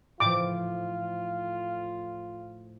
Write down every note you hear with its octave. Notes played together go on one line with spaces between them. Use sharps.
A2 F3 F4 D6